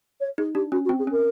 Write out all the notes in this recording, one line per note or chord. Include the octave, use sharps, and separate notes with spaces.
C#5
D#4 G#4
D4 G4
C#4 F#4
F#4
C4
G#4
C#4 A#4